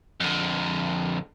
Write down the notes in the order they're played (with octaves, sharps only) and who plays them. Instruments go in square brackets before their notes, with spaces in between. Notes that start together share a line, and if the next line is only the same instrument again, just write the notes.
[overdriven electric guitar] F2 D3